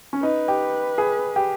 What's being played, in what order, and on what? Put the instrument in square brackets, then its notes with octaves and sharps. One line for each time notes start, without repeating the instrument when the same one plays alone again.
[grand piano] C#4
[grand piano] D#4 [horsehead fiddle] B4
[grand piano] G4
G#4
G4